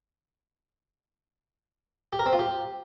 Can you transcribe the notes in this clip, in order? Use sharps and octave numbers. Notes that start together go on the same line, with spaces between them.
G4
A#4
C4
F4
G4